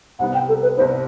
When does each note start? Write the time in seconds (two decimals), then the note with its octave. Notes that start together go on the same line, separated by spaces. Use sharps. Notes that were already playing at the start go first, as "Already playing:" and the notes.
0.19 C2 C3 G3 B3 F#5
0.34 G5
0.49 A4
0.63 B4
0.77 C2 C3 G3 B3 C5